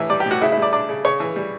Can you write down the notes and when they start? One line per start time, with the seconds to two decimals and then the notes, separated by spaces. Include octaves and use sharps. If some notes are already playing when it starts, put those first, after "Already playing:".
Already playing: A2 E3 E5
0.10 G3 D5
0.20 G4
0.26 A2
0.31 F#4
0.41 C#3 E4
0.52 E4
0.57 G3
0.62 D5
0.73 D4 D5
0.89 C#3
1.05 C#3 C#5
1.20 E3
1.36 G3